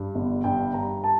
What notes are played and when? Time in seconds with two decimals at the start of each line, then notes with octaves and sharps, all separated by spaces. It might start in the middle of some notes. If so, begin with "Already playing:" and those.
Already playing: G2
0.15 G1
0.44 G2 G5
0.74 G2 A#5
1.04 A5